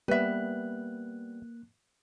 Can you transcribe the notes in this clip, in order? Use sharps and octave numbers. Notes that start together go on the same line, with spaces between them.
G3 A#3 B3 B4 E5 F#6